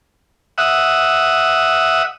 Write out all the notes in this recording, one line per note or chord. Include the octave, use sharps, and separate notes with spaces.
E5 F#5 D#6